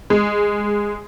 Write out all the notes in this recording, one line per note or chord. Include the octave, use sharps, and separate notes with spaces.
G#3